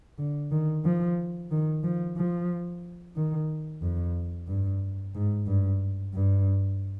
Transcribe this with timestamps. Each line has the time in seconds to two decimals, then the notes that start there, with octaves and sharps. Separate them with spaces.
0.18 D3
0.51 D#3
0.84 F3
1.51 D#3
1.84 F3
2.17 F3
3.16 D#3
3.82 F2
4.48 G2
5.14 G#2
5.46 G2
6.14 G2